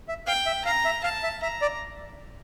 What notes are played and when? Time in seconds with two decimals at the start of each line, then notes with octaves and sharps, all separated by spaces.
0.08 E5
0.27 F5 G5
0.46 E5
0.65 F5 A#5
0.85 E5
1.03 F5 A5
1.23 E5
1.42 E5 A#5
1.61 D5